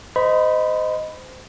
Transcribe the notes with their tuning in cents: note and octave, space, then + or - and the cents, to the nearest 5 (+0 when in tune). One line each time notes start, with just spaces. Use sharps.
C5 -30 D#5 +0 B5 +0